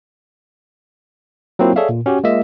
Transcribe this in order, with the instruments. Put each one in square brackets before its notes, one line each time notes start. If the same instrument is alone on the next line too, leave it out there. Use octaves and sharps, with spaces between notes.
[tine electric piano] F#3 A#3 C4 E4 F4
G#4 A4 C#5 D5 E5 F5
A#2
C#4 F#4 G4
G#3 A#3 F4 D#5 E5